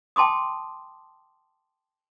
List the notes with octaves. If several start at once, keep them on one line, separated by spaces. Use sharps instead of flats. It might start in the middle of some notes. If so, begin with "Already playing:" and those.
G5 A5 C6 D6 D#6